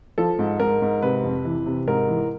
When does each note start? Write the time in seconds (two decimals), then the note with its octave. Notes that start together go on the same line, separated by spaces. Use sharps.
0.18 F3 A4
0.39 G#2
0.60 G#2 A#4
0.82 G#2
1.02 C3 B4
1.24 F2
1.45 E3
1.66 C3
1.87 G#2 A#4
2.08 E3